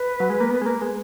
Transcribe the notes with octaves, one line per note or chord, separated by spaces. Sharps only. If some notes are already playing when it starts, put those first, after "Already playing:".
Already playing: B4
F#3
G#3
A#3
B3
G#3
A#3
G#3